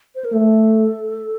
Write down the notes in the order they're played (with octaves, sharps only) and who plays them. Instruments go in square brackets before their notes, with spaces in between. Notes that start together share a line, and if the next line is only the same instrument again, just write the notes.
[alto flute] C5
A#4
[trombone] A3 [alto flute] A4